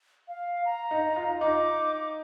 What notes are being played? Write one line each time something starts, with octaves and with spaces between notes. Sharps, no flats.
F5
A#5
D#4
F4
D#4 D6